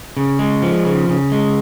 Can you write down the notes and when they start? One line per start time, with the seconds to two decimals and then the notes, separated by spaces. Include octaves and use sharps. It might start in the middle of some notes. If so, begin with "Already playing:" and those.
0.17 C#3
0.39 G#3
0.62 F3
0.85 C#3
1.08 C#3
1.32 G#3